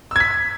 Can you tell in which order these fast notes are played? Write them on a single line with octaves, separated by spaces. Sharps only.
E6 G#6 B6